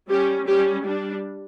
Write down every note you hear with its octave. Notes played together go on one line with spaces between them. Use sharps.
G3 C#4 G4
G3 C#4 G4
G3 D4